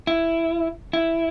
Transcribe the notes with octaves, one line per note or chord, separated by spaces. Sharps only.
E4
E4